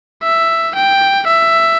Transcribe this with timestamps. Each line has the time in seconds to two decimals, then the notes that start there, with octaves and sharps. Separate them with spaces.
0.23 E5
0.75 G5
1.28 E5